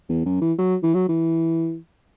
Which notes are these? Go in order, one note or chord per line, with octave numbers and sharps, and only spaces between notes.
E2
F#2
E3
F#3
E3
F#3
E3